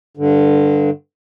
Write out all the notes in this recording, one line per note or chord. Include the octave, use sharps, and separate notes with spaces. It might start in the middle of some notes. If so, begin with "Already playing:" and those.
G2 D3